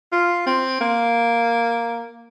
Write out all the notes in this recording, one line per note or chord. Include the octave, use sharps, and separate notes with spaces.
F4
C4
A#3